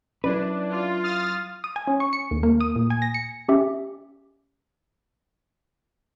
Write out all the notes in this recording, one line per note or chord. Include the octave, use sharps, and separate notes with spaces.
F#3 C#4 D4 E4 B4
F4
D#6 F6 A6
D#6
G#5
C#4
C#6
C#7
D#2
A#3
D#6
A#2
G#5
A#6
C#7
C#4 G4 E5